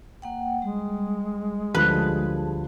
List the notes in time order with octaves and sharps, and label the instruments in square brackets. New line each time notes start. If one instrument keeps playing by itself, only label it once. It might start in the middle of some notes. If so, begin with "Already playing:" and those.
[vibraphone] A#3 F#5 G5
[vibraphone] G3 [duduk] G#3
[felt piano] D2 F3 G3 [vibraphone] G#4 A5 [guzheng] B4